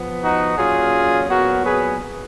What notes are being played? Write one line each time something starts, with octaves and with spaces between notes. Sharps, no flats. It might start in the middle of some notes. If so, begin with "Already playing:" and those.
Already playing: F3 B3
D#4 F#4
A#2 F#3 C#4 F4 G#4
A#2 F#3 B3 F#4 A#4
G#4 B4